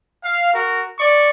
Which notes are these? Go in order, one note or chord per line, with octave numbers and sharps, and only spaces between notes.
F5
F#4 A#4
D5 C#6